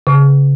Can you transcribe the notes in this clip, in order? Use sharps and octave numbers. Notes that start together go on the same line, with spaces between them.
C#3